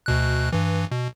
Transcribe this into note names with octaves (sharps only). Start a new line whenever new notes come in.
D2 B2 F#6
G2 E3
B2